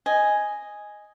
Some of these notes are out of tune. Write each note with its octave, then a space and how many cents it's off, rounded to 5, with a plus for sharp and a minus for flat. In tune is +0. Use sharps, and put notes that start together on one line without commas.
D#5 +0 G#5 +0